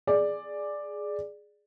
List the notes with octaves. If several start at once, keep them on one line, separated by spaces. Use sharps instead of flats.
G#4 D5